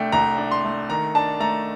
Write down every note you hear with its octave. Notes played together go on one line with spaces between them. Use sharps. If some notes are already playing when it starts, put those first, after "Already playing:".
Already playing: C2 A3 D4 G5
C2 A#5
D4
C6
A3
D#3 A#5
D4 A5
A3 A#5